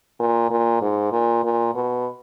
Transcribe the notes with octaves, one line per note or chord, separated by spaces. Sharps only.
A#2
A#2
G#2
A#2
A#2
B2